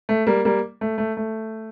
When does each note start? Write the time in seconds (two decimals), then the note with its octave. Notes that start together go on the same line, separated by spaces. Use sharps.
0.09 A3
0.27 G3 A#3
0.45 G3 A#3
0.81 A3
0.98 A3
1.17 A3